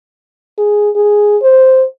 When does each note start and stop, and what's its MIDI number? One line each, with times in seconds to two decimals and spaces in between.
0.58 0.90 68
0.96 1.37 68
1.42 1.84 72